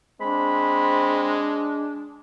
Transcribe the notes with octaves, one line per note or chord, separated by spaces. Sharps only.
G#3 C4 D4 B5